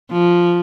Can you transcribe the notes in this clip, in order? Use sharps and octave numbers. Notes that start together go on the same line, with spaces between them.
F3